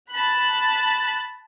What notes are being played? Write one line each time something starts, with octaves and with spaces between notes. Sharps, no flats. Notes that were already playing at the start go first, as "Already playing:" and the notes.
A5 B5 F#6